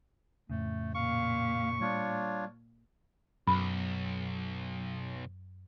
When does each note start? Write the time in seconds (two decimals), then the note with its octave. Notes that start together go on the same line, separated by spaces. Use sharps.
0.50 F2 A2 C#3 A3
0.95 A#2 F5 C#6
1.81 G3 D4 F4 C#5
3.47 B1 F#2 B5